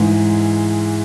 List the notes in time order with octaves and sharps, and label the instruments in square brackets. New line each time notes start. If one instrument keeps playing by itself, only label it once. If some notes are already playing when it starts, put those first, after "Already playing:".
Already playing: [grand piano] G#2 E3 G#3